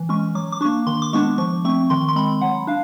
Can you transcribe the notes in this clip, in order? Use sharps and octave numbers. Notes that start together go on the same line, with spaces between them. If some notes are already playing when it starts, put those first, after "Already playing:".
Already playing: E3
G#3 C#4 C#6
F#3 D6
D6
A#3 D4 C#6
D#3 C6
D6
G#3 B3 D4 C#6
F3 C#6
A3 C4 C#6
D#3 C6
C6
G#3 C4 B5
F#3 F#5
D4 F5